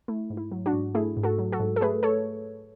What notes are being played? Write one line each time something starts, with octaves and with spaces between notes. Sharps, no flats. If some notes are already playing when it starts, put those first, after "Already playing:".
A3 E4
G#2
E4
F#3
D4 F#4
G#2
A3 E4 G#4
G#2
F#4 A4
F#3
F#4 A4
G#2
A4
A3 G#4 B4
A4 C#5